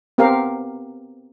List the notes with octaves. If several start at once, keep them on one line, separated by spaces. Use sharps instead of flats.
B3 C4 G4 A#4 F5